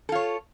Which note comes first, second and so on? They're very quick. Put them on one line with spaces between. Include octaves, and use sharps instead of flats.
A4 F4 C#5